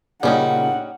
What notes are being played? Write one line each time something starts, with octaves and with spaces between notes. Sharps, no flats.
A#2 C#3 G3 C#4 D#4 F4 F#5